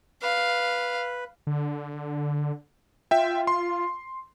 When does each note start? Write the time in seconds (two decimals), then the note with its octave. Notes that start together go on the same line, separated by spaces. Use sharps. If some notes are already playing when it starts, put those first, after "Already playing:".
0.23 B4 F5
1.47 D3
3.11 F4 E5 G5
3.47 C6